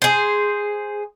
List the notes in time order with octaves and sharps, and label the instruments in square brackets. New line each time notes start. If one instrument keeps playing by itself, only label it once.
[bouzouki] G#4 C5